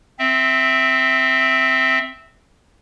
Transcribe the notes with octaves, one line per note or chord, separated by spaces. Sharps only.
C4 E5